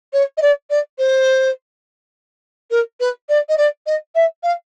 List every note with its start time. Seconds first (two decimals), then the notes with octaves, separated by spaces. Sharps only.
0.13 C#5
0.37 D#5
0.42 D5
0.70 D5
0.98 C5
2.71 A#4
3.00 B4
3.29 D5
3.49 D#5
3.58 D5
3.87 D#5
4.15 E5
4.43 F5